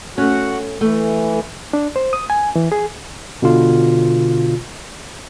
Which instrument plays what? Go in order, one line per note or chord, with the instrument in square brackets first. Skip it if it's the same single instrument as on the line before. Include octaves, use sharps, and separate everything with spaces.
[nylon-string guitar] A3 C#4 [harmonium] F#4 F#5
[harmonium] E3 [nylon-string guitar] A3
[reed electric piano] D4
C5
D#6
G#5
E3
G#4
[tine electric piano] B2 D3 F4